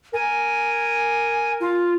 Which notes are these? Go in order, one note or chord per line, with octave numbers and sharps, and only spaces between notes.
A#4 G#5
F4